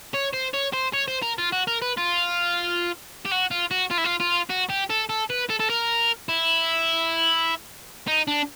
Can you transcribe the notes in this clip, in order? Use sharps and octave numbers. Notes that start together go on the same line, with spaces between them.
C#5
C5
C#5
C5
C#5
C5
A#4
F4
F#4
A#4
B4
F4
G4
F#4
F4
F#4
F4
E4
F4
F4
F#4
G4
A4
A4
B4
A4
A4
A#4
E4
D#4
D4